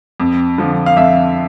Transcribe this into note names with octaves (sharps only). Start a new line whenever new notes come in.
F2
D3 F3
F5
F2 E5